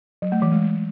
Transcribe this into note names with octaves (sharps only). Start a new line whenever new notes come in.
F#3
A3
E3
G#3